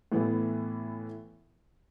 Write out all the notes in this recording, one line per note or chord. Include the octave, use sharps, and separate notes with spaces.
A2 E3 B3 E4